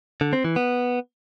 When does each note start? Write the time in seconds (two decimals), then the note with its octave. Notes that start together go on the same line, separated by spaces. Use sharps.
0.21 D3
0.33 C4
0.45 E3
0.56 B3